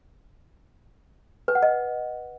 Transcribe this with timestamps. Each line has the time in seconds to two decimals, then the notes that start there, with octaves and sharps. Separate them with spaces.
1.48 B4
1.55 F#5
1.63 D#5